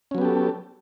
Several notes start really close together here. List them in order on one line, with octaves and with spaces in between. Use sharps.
C#4 F#3 B3 G4 A4